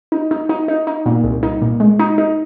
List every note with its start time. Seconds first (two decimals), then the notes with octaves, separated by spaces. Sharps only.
0.12 D#4
0.31 D#4
0.49 D#4
0.68 D#4
0.87 D#4
1.06 A#2
1.24 C2
1.43 D#4
1.62 A#2
1.80 G#3
1.99 D#4
2.18 D#4